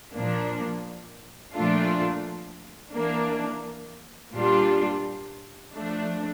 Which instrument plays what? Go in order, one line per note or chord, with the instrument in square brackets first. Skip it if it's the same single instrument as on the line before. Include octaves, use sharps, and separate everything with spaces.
[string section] A#2 F3 A#3 D4
A#2 F3 A3 D4 F4
E3 A#3 D4
A#2 G3 D4 F4
F3 A3 D4